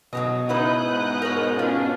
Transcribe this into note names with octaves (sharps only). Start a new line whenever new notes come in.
B2 F#3 G4 D#5
C#3 D#4 E4 B4 D#6 F#6 G6
G#2
A#4 C#5
C#4 D4 F4 G#4